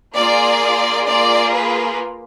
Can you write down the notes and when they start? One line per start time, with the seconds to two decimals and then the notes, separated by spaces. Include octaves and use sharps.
0.16 A#3 F4 G#4 D5
1.07 A#3 F4 G#4 D5
1.53 B4